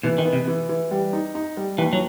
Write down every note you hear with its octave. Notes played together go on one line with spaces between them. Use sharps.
B2 E3
D#3
B3
C3
E3
E3
G3
D#4
D#4
G3
D#2 E3
F#3